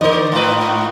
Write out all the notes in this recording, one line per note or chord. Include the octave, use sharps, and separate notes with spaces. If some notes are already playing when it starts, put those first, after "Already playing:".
D3 A#4 C5 D5 D#5
G#2 D#4 F4 B4